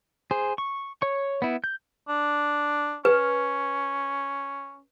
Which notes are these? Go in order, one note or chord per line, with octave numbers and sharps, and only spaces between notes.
G#4 C5
C#6
C#5 C#6
B3 E4
G6
D4
C#4 B4